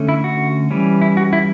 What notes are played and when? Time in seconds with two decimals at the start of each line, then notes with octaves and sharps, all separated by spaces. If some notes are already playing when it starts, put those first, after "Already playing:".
Already playing: D3 A3 C#4
0.09 E4
0.24 F#4
0.71 E3 G3 C#4
1.01 E4
1.17 F#4
1.33 E4